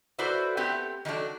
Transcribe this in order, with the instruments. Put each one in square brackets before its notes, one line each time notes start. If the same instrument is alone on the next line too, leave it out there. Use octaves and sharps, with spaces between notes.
[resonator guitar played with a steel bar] E4 F#4 A4 B4 C5 D5
A3 B3 C4 G4
D#3 F#3 A3 D4